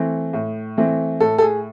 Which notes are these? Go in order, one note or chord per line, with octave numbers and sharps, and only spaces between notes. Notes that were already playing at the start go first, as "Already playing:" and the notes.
Already playing: E3 A3 C4
A2
E3 A3 C4
A2 A4
A4
G#4